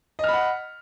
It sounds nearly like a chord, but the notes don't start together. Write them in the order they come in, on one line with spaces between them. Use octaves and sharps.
D#5 F6 B5 F#5